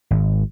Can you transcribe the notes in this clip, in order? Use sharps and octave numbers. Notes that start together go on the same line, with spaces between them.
G#1